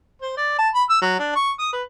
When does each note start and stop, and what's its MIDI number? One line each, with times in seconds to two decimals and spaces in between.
0.22 0.33 72
0.37 0.54 74
0.58 0.69 81
0.74 0.84 83
0.89 0.98 88
1.02 1.18 54
1.19 1.35 62
1.36 1.51 85
1.59 1.71 87
1.73 1.82 71